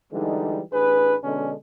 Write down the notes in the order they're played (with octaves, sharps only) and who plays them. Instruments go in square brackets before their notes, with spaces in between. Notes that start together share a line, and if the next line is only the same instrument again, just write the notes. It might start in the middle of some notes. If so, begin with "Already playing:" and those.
[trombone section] D3 E3 G3 G#3 D#4
A1 D4 G#4 B4
B2 D3 G#3 C#4 D4 A4